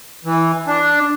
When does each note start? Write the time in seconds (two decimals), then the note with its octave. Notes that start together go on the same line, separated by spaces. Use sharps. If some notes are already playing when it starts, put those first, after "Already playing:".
0.25 E3
0.67 D4